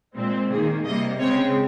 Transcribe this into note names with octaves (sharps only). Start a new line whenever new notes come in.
A#2 G#3 C4
D#3 A#3 G#4
C3 G3 A#3 D#5
C#3 G#3 C4 C#5